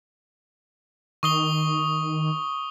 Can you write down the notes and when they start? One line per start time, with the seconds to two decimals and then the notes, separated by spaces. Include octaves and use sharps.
1.23 D#3 C#6 D#6 G7